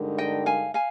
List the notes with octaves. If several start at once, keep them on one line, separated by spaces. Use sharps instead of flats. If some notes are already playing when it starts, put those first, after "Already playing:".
Already playing: G2 D3 G#3 D#4 A#4
D#5 G5
F5 G#5
F5 G#5